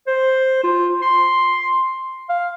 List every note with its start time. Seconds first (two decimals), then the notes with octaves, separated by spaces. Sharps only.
0.08 C5
0.64 F4
1.02 C6
2.30 F5